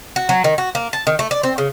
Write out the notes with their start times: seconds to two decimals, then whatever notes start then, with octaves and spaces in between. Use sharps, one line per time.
0.16 F#4
0.29 F#3
0.44 D#3
0.58 F#4
0.75 A#3
0.93 A5
1.07 D#3
1.19 A3
1.31 D5
1.43 C4
1.58 C#3